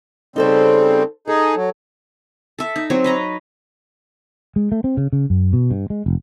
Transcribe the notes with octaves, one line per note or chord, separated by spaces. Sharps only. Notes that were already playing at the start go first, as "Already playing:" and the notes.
C#3 G3 C4 D#4 A4 C5
D#4 G#4 A4
F#3
A4 E5
D#4
F#3 C4 C#5
B4 D#5 A#5
G#3
A3
C4
C#3
C#3
F#2
B2
G2
G#3
F1